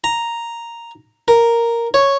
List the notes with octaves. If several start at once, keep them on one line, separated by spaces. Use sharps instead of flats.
A#5
A#4
C#5